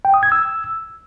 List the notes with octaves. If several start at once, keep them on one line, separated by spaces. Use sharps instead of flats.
G5
D#6
G#6
E6